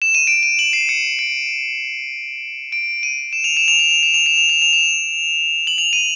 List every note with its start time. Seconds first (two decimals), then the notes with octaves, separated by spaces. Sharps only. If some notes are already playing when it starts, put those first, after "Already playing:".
0.02 E7
0.15 D#7
0.27 D7
0.43 D#7
0.59 F#7
0.73 C7
0.89 C#7
1.19 D7
2.72 D7
3.03 D#7
3.33 E7
3.44 F7
3.57 E7
3.68 F7
3.79 E7
3.91 F7
4.03 E7
4.14 F7
4.26 E7
4.38 F7
4.49 E7
4.62 F7
4.73 E7
5.67 F#7
5.78 F7
5.93 D#7